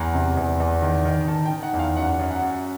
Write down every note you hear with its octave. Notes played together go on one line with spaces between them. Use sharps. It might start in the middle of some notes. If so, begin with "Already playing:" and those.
Already playing: E2 A#5
C3
E2
E2
D#3
D#3
D#3 A5
G5
D#3
F#5
E2
F5
F#2 F#5
F#2
F#5
F#2